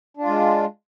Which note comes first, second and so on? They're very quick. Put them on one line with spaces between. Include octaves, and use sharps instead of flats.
D4 F4 G#3